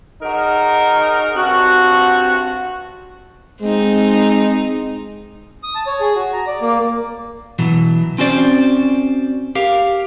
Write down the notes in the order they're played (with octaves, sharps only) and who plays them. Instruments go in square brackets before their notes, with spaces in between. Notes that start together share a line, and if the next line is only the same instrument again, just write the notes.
[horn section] F#3 D#4 G#4 A#4
G2 C4 F#4
[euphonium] G#3 [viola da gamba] C4 D#4
[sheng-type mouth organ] D#6
A5
C#5
G#4
F#4
A#5
D5
A#3
[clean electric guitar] B2 E3 F#3
C4 C#4 F#4 C5 D5
G4 A#4 F5